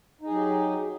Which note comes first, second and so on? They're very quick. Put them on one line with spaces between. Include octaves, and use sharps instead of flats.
D#4 G#4 F#3 G4